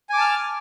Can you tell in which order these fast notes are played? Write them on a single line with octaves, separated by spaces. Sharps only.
G#5 D6 A5 F6